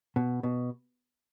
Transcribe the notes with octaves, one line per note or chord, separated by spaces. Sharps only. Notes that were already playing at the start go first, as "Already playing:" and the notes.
B2
B2